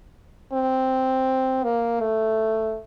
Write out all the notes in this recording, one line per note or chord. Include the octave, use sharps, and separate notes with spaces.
C4
A#3
A3